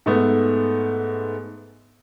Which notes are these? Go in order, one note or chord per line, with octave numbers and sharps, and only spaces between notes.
G#2 A3 B3